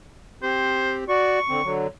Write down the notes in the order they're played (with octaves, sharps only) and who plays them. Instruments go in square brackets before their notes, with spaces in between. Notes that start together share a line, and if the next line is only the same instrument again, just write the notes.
[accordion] C4 G4 [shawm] C5
[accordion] F#4 D5 [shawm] C#6
[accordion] D3 C4
D3 F#3